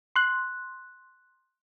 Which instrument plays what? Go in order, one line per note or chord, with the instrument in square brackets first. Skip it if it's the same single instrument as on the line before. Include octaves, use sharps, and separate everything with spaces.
[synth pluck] C6 F#6